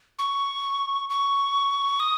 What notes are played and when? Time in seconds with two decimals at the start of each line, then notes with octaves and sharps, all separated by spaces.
0.19 C#6
1.10 C#6
2.00 D#6